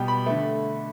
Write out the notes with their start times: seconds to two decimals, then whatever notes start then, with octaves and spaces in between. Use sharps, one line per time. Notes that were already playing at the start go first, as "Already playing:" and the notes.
Already playing: B2 G3 B3 G5
0.08 B5
0.26 D3 A3